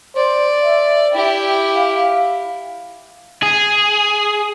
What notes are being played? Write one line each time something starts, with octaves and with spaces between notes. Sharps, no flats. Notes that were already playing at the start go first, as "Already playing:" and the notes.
C5 D5
E5
E4 G4 G5
F5
G#4